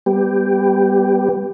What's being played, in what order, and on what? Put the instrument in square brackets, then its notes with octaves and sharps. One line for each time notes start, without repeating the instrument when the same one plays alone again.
[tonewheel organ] G3 B3 G4